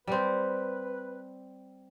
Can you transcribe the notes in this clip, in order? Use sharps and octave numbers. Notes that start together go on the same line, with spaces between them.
G3 C4 B4